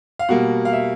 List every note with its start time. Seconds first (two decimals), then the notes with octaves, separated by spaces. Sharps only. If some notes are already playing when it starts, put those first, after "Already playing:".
0.19 F5
0.29 B2 G3 A#3 F#5
0.65 F5
0.73 E5